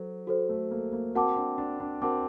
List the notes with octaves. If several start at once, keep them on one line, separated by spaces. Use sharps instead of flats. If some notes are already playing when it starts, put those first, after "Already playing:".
Already playing: F#3 F#4 A4 C5
F#4 A4 C5
A3
A#3
A#3
C4 F#4 A#4 F#5 A5 D6
D4
D4
D4
C4 F#4 A#4 F#5 A5 D6